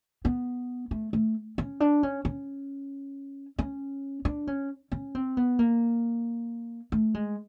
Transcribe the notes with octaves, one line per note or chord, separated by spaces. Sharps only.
B3
A3
A3
C#4
D4
C#4
C#4
C#4
D4
C#4
C#4
C4
B3
A#3
A3
G#3